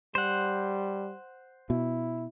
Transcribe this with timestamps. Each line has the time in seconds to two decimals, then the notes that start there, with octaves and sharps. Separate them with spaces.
0.15 G3 C5 F#5
1.70 B2 E4